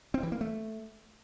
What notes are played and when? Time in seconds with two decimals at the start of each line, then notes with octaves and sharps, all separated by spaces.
0.14 C4
0.23 E3
0.32 A#3
0.41 A3